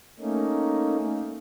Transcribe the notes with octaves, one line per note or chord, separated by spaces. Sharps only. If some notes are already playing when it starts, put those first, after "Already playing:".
A3 A#3 C#4 D#4